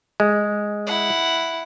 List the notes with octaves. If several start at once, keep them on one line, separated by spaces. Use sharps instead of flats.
G#3
E4 F#5